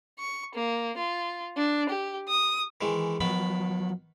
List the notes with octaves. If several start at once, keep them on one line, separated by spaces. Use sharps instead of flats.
C#6
A#3
F4
D4
G4
D#6
D#3 E3 G#3
D#3 F3 F#3 B3 B5